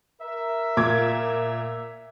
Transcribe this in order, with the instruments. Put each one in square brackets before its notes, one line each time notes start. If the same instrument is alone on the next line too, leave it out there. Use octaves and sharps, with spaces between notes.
[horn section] A#4 E5
[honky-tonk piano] A#2 D6 G#6